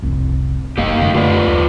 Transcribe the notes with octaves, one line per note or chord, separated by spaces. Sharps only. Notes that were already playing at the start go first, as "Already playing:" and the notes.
F1 C2
F#1 A#3 G4 D#5 F5
F#2 D3 A3
F4 B4 D5
D#2